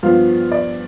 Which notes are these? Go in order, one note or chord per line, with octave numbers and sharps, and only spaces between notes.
G2 F3 B3 F4
D5